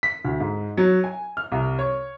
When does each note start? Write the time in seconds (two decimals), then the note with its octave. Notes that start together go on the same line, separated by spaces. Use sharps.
0.03 B6
0.25 D2
0.40 G#2
0.77 F#3
1.04 G#5
1.37 F6
1.52 C2
1.79 C#5